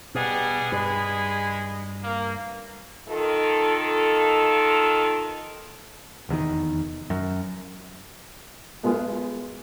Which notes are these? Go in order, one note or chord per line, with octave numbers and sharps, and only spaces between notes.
B2 G3 G#4 F#5
G2 G#3 G#4 B5
A#3
D#3 F4 A4
F1 E2 B2 D#3
F#2
B1 G#3 B3 F4 G#4 B4